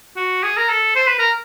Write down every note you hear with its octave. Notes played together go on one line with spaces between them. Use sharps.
F#4
G#4
A#4
A4
C5
B4
A#4